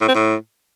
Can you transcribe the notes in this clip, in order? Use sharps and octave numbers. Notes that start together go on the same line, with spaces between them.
A2
C4
A2